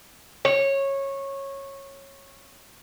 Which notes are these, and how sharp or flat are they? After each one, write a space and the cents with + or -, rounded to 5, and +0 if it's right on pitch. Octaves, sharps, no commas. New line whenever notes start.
C#5 -15